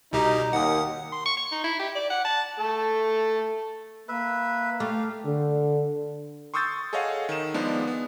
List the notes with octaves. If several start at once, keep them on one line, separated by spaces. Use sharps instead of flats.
C2 B2 D#4 G4
D#2 F#5 D#6
C6
C#6
C#6
D#4
E4
G4
D5
F#5
A5
A3 A4
A#3 B4 E5
A3 G4 F5
D3
C6 C#6 D#6 E6 G6 A6
G#4 A4 C#5 D#5 F5 F#5
D#3 E7
F3 G#3 B3 D4 D#4
B3